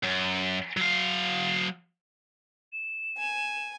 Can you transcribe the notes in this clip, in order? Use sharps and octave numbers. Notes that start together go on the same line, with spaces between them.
F#2
F#3 F5
E7
G#5